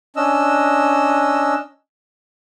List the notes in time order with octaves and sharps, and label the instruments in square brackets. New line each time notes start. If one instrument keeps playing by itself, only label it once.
[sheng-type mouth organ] C#4 D4 D#5 E6